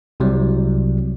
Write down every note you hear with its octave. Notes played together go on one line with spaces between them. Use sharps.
C2 C3 F#3 G3